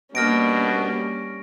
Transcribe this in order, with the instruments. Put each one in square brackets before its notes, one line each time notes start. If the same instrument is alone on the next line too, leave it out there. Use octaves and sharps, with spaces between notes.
[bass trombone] B2 [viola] G3 C#4 [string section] A#3 D4 [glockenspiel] F6 A#6 D7